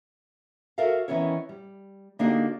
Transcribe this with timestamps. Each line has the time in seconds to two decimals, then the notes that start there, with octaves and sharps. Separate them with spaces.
0.78 F#4 A4 A#4 D5 E5 F5
1.08 D#3 E3 B3 C#4 E4 C#5
1.49 G3
2.19 D3 A#3 D4 D#4 F#4 G4